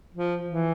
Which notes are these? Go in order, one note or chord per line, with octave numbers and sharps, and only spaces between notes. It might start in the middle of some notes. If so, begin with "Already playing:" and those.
F3
E3